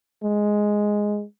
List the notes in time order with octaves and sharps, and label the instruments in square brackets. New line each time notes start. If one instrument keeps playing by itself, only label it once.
[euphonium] G#3